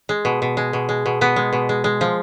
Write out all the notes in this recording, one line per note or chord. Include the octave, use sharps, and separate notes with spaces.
G#3
B2
B2
G#3
B2
G#3
B2
B2 B3
G#3
B2
G#3
G#3
F3